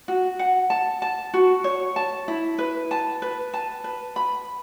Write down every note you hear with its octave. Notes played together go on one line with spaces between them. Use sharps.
F#4
F#5
A5
A5
F#4
C#5
A5
E4
B4
A5
B4
A5
B4
B5